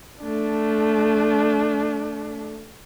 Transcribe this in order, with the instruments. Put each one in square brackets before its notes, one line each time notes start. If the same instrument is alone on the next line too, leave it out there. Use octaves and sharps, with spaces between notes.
[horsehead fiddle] A3 D4